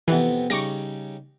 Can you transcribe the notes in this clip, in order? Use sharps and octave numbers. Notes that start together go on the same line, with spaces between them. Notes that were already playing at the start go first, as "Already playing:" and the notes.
F2 C3 E3 B3
C#3 G3 D#4 C#6 D6 A#6